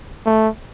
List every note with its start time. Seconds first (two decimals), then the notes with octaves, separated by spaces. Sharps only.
0.26 A3